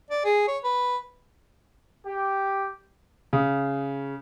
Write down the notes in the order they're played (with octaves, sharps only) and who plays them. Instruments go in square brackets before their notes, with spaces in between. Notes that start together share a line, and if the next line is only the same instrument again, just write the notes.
[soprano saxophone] D5
G#4
C#5
B4
[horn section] G4
[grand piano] C#3